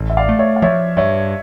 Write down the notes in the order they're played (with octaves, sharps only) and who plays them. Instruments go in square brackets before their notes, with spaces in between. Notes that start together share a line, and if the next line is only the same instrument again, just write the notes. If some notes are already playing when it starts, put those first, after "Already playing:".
Already playing: [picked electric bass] A1
[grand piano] E5
D5 F5
[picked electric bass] A3
[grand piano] C#5 E5
F5
[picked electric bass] F3 [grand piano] C#5 E5
[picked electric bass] G2 [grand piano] C#5 E5